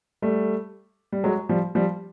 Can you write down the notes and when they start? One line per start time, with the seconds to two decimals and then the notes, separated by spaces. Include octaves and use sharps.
0.22 G3 A3
1.12 G3
1.24 F#3 G#3
1.49 F3 G3
1.75 F3 G3